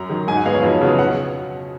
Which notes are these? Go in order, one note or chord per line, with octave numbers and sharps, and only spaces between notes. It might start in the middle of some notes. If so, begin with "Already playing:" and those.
Already playing: F#2 A#5
D#3 F#3
G#2 G#5
F#5
F#3 B3 D#4 G#4 F5
C#5
F2
C#3 F#3 B3 F#4
B2 F#5